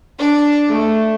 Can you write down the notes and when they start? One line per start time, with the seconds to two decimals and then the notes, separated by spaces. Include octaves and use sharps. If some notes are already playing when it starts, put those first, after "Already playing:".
0.20 D4
0.69 A3